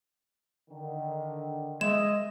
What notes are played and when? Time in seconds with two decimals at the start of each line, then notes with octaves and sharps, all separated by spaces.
0.70 D3 D#3
1.81 G#3 D#5 E5 E7